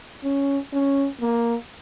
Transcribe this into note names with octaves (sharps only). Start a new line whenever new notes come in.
C#4
C#4
A#3